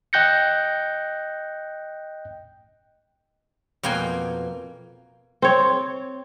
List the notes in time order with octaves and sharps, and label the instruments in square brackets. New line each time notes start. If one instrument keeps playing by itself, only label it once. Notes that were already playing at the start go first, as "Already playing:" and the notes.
[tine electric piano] D#5 G5 F#6 G6 A#6 C#7
[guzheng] F2 B2 A#3 G5 G#5
[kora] C4 C#5